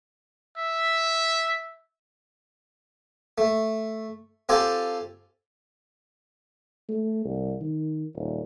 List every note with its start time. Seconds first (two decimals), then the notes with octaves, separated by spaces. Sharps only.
0.57 E5
3.38 A3
4.49 C4 F4 G4 A4 G#5 A5
6.89 A3
7.25 C2
7.61 D#3
8.15 D#1